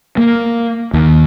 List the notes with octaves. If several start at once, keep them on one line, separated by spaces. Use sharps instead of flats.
A#3
D#2